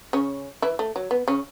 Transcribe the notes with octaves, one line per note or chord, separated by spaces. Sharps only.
C#3 C#4
E3 E4
A3
F#3
B3
C#3 C#4